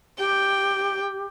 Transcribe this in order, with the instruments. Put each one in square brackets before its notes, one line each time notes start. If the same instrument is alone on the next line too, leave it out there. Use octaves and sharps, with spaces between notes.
[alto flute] G4 [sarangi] G5